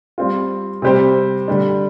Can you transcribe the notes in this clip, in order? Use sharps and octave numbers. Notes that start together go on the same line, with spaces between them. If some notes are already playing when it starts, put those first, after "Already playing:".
G3 C4 F4
C3 G3 C4 G4 C5
D3 G3 D4